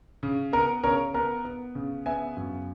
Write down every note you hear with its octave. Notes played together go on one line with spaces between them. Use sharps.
C#3
B3 A#4
C#3 A#4 C#5
B3 A#4
B3
C#3
B3 E5 G#5
F#2